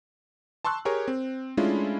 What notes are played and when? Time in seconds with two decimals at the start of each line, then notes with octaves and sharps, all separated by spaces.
0.65 A5 C6 C#6 E6 F#6
0.85 G4 G#4 A#4 C#5
1.08 C4
1.57 G#3 A3 C#4 D4 E4 F4